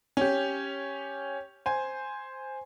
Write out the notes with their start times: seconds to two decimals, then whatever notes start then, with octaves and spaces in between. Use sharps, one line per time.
0.17 C#4 G4
1.66 C5 G#5